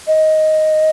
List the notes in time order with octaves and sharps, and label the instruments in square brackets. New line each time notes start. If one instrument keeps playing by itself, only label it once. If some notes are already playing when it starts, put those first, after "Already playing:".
[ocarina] D#5